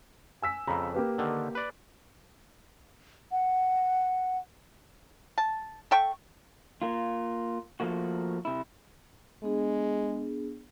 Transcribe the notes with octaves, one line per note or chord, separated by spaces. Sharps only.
G#5 E6 B6
F2 C#3 A#5 B5
A#3 G4 B4
D3 D#3
B4 D5
F#5
A5
A4 E5 G5 C#6
A#3 F4
F3 A3 A#3 F#4
C3 E4
G#3 B3 D4 G#4